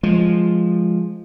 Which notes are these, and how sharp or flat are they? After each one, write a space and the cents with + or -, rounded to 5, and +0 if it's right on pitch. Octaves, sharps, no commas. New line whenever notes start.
F3 +0 G#3 +0